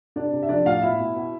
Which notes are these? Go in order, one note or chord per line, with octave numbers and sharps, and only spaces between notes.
C3 D4 D5
C3
E5
F3 D4 D5
A2 F4 F5
B2 E4 E5
B2
B2